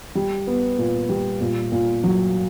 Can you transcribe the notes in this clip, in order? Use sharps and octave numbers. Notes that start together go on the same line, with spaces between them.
G3
B3
A#2
G3
A#2
A#2
F#3